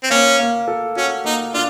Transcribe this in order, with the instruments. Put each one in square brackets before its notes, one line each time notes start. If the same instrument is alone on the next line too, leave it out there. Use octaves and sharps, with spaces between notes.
[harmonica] C4
[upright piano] A#3 [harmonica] C#4
[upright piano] A#3
A4
[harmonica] C#4 [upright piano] F#4
[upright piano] A#3 [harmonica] D#4
[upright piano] D4 [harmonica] F4